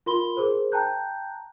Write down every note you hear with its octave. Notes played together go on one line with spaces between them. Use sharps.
F4 A#4 B5 C6 G7
G#4 A#4 C5
G5 A5 A#5 F#6 G6